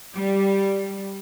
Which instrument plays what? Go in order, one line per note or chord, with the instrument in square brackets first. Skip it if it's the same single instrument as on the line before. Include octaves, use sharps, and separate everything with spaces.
[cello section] G3